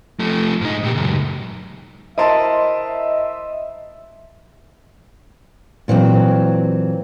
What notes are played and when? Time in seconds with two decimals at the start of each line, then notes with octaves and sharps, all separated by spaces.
0.19 F3 A3
0.61 G#2 D#4
0.83 A#2 G4
0.95 C#2 F#2
2.18 E4 A#4 C5 D#5 E5 A5 C6 A6
5.88 A#2 E3 F#3 C4